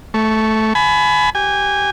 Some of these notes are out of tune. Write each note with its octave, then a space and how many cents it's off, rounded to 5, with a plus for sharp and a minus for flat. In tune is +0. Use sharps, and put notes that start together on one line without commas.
A3 -10 C#6 +0
G#5 +30 B5 +15
G4 -20 G#5 -25